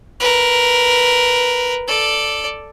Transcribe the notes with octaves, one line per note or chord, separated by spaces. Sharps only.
A#4 B4
A4 D5